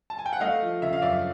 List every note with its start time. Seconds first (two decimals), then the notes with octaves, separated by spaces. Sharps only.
0.10 A5
0.19 G#5
0.26 G5
0.33 F#5
0.40 A3 D#5 F5
0.62 F3
0.82 C#3 E5
0.93 F5
1.02 F#2 D5 E5